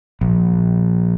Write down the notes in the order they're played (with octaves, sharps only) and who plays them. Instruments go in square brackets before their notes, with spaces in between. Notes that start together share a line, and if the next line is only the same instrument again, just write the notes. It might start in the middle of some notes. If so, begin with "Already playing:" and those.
[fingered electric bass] A#1